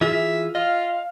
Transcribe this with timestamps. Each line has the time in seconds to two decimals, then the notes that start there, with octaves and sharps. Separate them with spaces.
0.01 E3 F4 G#4 E5
0.55 F4 D#5 F5